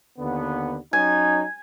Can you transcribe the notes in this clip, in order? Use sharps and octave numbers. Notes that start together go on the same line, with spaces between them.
D#2 D3 B3
F#3 C#4 D#4 G#5